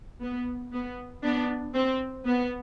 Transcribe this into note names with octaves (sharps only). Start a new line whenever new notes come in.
B3
B3
B3 D4
C4
B3